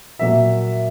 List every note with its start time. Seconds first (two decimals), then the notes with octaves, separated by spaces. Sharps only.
0.19 A#2 F#3 A#3 E5